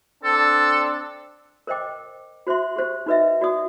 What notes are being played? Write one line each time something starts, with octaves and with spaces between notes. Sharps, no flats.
C4 D4 A4
A#4 C5 D#5 G5 D6
F#4 C5 E5 C6
G4 C5
D#4 F#4 B4 D#5 E5
F#4 D5 D#6